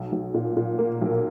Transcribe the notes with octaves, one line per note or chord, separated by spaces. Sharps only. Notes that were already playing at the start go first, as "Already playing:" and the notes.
Already playing: B1
B1
A#2
A#2
A#3
B1